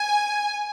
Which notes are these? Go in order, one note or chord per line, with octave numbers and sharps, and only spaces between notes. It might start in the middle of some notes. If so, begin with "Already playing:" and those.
Already playing: G#5